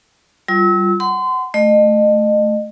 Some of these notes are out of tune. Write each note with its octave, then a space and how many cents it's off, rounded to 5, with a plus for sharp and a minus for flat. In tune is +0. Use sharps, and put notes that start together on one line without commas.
G3 -25 F4 +0 E6 -30
F#5 +15 C6 -30
A3 -10 D#5 -30